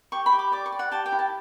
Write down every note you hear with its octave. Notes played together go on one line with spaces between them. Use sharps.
G4 C#6
B5
G4
D6
D5 D6
C#6
D5
F#5
G4 A5
G5
E4
A5